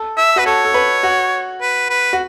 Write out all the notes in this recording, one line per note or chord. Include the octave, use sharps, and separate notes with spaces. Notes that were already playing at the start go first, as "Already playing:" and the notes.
Already playing: A4
E5
F#4 B4
A4 C#5
A4
B4
F#4
B4
B4
F#4